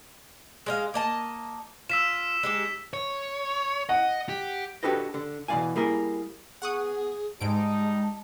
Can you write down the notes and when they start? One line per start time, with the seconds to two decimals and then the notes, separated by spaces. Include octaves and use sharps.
0.66 G#3 D#5 F5
0.94 A#3 D#5 A5
1.89 F4 E6 B6 E7
2.43 G#3 D#4 G4 E7
2.93 C#5
3.89 D#5 F#5
4.29 G4
4.83 D4 F#4 G4 A4 B4 D#5
5.14 D3
5.48 B2 E3 G#3 D5 F5 G#5
5.76 G3 A#3 E4 G#4 A#4
6.62 B3 G#4 F#5 C#6 D#6
7.41 G#2 G3 G#3 D#4 A5 D7